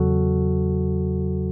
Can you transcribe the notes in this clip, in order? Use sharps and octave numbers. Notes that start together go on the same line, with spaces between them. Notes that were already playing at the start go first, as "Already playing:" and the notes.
Already playing: E2 C#3 F#3 F#4 A4